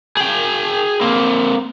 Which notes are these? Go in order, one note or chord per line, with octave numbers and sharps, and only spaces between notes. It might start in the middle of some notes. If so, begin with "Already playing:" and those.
G#4 G5
A#3 C4